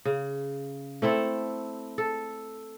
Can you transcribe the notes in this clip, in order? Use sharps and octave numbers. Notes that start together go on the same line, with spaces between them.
C#3
A3 C4 E4 A4
A4